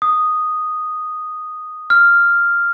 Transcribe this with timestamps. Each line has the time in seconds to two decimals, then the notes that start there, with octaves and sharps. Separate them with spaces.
0.02 D#6
1.90 F6